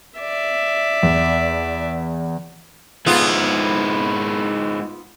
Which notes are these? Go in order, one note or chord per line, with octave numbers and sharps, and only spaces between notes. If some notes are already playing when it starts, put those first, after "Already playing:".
D5 E5
E2
G#2 B3 E4 F4